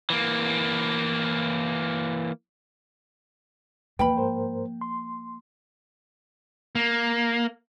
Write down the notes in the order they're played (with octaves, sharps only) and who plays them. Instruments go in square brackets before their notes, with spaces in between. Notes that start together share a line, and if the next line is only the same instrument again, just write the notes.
[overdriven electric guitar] E3 A#3
[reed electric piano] E2 B4 [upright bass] F3 A#3 [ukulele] G5 B5
[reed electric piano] G#2 A#4 C5
C6
[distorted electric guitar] A#3